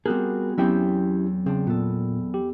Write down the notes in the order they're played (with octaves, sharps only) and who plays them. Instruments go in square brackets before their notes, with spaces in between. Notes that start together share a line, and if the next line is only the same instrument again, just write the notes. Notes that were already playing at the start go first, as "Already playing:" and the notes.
[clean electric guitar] G3 F#4 G#4 [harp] B3 C4 [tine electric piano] A#4
[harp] E2 C4 E5 [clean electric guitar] F#3 G5 [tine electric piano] C#4 E4 G4
[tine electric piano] C#3 [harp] C4 D4
[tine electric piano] A#2 [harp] B3 A4
[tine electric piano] G4